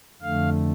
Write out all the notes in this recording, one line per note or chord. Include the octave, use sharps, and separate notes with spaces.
F2 D3 A3 F5